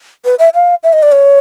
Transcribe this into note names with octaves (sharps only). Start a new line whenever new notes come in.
B4
E5
F5
E5
D#5
D5
C#5